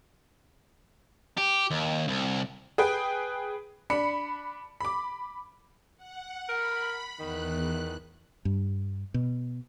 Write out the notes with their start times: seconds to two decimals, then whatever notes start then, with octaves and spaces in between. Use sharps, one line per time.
1.38 G4
1.71 D#2
2.08 C2
2.78 G#4 B4 G5
3.90 D4 B5 C#7
4.81 B5 D6
5.97 F#5
6.49 A#4 B5
7.19 E2 D#3 F#6
8.45 G2
9.14 B2